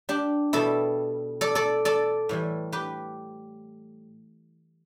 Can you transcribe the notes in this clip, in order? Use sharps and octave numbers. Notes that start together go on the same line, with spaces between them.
D4 G4
B2 G3 E4 A4
A4 D5
A4 D5
A4 D5
A2 E3 G3
G4 B4